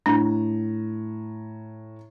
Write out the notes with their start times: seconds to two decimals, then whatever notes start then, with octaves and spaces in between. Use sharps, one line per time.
0.06 A2 D4 A#5